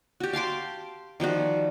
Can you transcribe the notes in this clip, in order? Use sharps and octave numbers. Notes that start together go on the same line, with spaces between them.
F#4 G4
F5 A5 C6 D6
D#3 F3 G3 F#4